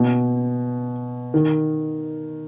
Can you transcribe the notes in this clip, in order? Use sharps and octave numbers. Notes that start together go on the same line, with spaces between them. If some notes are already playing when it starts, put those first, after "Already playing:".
Already playing: B2
D#3